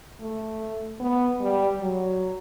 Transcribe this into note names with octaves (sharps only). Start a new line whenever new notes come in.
A3
B3
G3
F#3